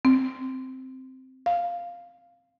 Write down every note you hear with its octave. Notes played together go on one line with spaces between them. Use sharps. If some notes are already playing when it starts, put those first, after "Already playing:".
C4
F5